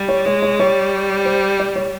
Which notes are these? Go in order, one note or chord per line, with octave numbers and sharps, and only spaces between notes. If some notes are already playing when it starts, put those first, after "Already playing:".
Already playing: G3
C#5
G#3 C#5
C#5
G3 C#5
C5
D5
C#5